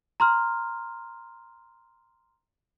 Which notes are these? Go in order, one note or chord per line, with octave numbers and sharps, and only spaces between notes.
A#5 C6 F6